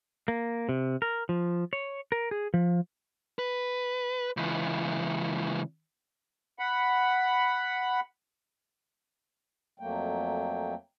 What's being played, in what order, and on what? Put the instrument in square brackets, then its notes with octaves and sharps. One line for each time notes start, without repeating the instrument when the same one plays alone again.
[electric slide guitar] A#3
C3
A#4
F3
C#5
A#4
G#4
F3
[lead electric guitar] B4
C#2 E3
[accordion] F#5 B5
[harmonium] F2 F#3 A3 A#3 G5